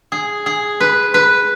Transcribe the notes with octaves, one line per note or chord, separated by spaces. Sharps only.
G#4
G#4
B4
B4